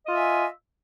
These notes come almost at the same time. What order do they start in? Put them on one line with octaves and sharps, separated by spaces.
D#5 F4 E5 G#5